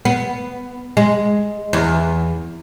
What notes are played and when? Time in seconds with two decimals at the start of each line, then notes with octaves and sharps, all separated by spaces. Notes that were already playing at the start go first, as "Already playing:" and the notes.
0.05 B3
0.97 G#3
1.73 E2